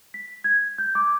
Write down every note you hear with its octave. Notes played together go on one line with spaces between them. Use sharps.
B6
G#6
G6
D6